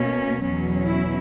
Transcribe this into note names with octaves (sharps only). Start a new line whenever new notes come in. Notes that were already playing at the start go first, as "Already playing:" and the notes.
Already playing: B2 A#3 C#4
E2 B2 F#3 C#4
E4